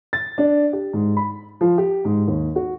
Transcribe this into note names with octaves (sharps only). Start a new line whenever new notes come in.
A6
D4
G4
G#2
B5
F3
G4
G#2
D#2
F#4